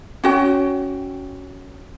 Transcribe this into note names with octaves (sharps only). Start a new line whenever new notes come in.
C#4 F#4 G5